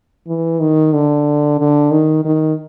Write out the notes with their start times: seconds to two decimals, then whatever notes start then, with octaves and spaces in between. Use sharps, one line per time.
0.27 E3
0.60 D#3
0.93 D3
1.59 D3
1.91 D#3
2.25 D#3